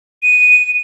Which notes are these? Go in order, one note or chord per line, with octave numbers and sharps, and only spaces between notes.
D#7